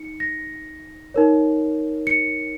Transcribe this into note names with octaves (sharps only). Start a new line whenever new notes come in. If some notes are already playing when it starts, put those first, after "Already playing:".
Already playing: D#4 C#7
A#6
D#4 A#4 C#5
C#7